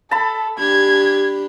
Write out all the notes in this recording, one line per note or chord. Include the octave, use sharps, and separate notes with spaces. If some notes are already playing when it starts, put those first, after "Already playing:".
A4 A5 B5
D4 G4 G#6